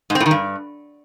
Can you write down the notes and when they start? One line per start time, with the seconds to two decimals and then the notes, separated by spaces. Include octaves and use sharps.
0.10 G#2
0.15 C4
0.20 A2
0.26 D#3
0.31 G2